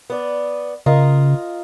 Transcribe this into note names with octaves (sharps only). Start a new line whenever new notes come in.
B3 D5
C#3 F4 A#4 D#5